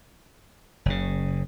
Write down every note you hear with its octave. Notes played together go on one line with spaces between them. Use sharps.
F#1 C#3